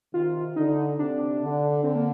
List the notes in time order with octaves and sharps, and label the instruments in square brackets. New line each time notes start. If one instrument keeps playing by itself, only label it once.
[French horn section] C3 D#3 [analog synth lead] F4
[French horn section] D3 [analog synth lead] D#4
[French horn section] C3 [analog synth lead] D4
[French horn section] D3
[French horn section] D3 [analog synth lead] C4
[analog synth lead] A#3